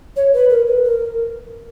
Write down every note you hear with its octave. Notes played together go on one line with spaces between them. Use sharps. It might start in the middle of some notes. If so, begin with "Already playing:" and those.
C#5
B4
A#4
B4
A#4